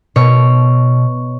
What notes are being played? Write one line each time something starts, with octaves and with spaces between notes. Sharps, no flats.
B2 C#5